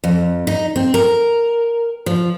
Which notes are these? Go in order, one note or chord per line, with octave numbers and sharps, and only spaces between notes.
F2
D#4
C4
A#4
F3